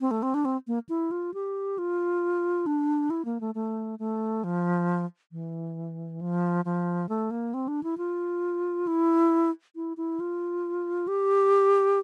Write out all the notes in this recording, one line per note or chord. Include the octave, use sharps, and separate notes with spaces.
C4
A3
C4
D4
C4
A#3
E4
F4
G4
F4
D4
E4
A#3
A3
A3
A3
F3
E3
F3
F3
A3
A#3
C4
D4
E4
F4
E4
E4
E4
F4
G4